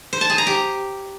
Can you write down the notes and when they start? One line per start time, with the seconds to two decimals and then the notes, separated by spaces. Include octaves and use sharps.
0.13 C5
0.21 A5
0.30 G#4
0.38 A#5
0.47 G4